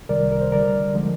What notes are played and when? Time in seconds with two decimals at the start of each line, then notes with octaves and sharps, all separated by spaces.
0.09 C2 C3 D#3 G3 A#4 D5
0.32 A#4
0.41 C5
0.52 D2 D3 G3 A#4 D5
0.94 D3 F3 G#3